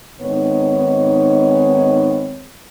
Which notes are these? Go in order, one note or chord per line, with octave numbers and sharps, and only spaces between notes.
G#2 D#3 B3 C4 C#5